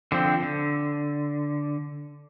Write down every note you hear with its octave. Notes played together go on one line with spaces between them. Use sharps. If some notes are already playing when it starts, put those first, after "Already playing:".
D3 F3 C4
D3